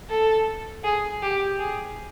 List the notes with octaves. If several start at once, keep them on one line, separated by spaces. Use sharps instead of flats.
A4
G#4
G4
G#4